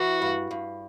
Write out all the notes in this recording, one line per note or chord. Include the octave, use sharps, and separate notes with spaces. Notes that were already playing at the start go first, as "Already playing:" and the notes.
Already playing: E3 F#4
G2
G2